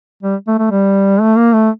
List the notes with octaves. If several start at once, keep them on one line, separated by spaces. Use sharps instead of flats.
G3
A3
A3
G3
A3
A#3
A3